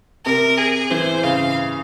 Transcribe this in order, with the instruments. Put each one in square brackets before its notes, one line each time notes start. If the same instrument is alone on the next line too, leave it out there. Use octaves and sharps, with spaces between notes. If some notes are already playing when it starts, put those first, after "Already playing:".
[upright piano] C3 [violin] A#4
[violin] G#4
[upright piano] E3 [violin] C5
[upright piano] C#3 [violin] F5